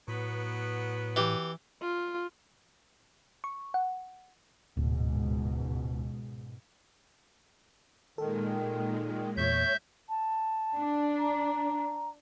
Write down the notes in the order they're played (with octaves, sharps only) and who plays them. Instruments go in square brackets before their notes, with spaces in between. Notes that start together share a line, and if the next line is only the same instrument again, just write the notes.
[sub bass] A2 [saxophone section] F#3 B3
[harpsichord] E3 G4
[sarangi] F4
[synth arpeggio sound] C#6
F#5
[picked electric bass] D1 [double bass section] C#2 G#2 B2
[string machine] A#2 G#3 [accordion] D#3 [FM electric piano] A4
[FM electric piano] E2 A#2 [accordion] C#5 [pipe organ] E5 G6
[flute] A5
[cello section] D4
[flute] A#5